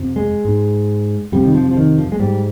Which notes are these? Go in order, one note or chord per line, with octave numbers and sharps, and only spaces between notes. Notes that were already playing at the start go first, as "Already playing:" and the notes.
Already playing: F2 C3
G#3
G#2
F2 C3 G3
D#3
F3
F3
D#3
F3
G#3
G#2 G3